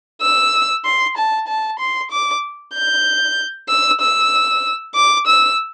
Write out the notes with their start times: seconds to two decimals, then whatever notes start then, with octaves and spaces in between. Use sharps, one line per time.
0.22 E6
0.85 C6
1.17 A5
1.48 A5
1.79 C6
2.11 D6
2.74 G6
3.69 E6
4.01 E6
4.95 D6
5.27 E6